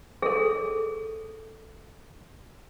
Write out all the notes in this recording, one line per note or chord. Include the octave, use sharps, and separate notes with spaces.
G#4 A4